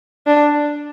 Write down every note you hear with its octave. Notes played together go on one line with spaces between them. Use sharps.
D4